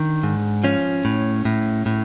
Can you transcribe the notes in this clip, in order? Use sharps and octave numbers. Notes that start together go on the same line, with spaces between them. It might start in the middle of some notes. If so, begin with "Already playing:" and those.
Already playing: D#3 D4
G#2
F3 C#4
A2
A2
A2